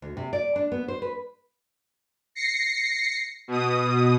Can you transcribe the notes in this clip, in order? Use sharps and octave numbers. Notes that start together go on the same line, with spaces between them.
D2
C3
D5
D4
B3
C5
B4
A#6 C7 C#7
B2 D#6